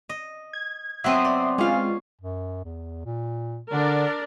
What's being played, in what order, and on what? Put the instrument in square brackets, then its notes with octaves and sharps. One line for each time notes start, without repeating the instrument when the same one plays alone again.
[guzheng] D#5
[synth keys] G#6
[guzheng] F#3 B3 C4 [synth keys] E5 C6 D#6
[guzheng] D5
[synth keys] G#3 C4 F4 [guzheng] C#4 F5
[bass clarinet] F#2
E2
A#2
[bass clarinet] D3 [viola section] D4 A#4 D5